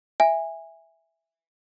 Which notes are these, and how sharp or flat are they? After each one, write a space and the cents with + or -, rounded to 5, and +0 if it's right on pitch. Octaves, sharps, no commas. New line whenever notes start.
E5 +0 G#5 -20